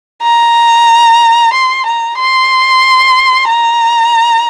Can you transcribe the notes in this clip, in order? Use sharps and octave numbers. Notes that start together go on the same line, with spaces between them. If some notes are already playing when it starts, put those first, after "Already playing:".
A#5
C6
A#5
C6
A#5